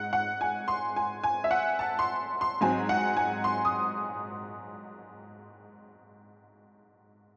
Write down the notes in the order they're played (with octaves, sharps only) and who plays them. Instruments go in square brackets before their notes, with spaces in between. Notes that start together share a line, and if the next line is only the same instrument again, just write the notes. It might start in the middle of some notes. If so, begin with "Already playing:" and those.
Already playing: [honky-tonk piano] G#2 F#5
F#5
G#5
C6
G#5
G#5
E5
F#5
A5
C6
C6
G#2 F#3 C4 G#5
F#5
G#5
C6
D#6